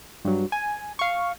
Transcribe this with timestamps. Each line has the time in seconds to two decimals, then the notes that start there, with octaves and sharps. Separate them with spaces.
0.25 G2 F#3
0.52 G#5
0.99 F5 C#6